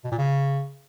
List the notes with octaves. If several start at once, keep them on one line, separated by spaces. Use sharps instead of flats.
B2
A#2
C#3